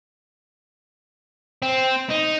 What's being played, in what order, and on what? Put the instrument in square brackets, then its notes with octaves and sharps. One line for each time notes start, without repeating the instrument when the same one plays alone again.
[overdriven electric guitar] C4
D#4